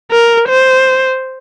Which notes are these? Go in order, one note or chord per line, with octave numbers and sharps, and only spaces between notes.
A#4
C5